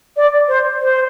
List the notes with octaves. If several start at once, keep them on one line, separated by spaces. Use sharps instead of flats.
D5
C5
C5